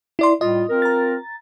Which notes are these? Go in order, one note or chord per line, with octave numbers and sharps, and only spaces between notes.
E4 D5 C6
A2 G3 F4 D#5
C4 F4 A#4
A#5 A6